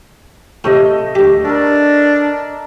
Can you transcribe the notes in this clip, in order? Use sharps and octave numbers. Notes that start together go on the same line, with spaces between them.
A2 C3 A3 D#5
D2 G4
D4 A4 A#4